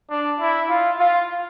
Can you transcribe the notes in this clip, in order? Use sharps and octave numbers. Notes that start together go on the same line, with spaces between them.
D4
E4
F4
F4